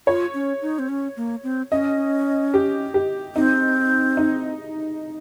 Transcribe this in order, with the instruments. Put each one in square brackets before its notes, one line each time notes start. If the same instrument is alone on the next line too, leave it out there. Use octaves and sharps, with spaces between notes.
[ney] F4 [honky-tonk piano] C#5
[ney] C#4
D#4
C4
C#4
A#3
C4
[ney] C#4 [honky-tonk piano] D#5
[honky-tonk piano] G4
G4
[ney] C4 [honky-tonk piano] D#4
[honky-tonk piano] D#4